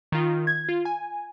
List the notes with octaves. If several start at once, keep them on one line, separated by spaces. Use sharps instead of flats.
D#3 F4
G#6
F4
G#5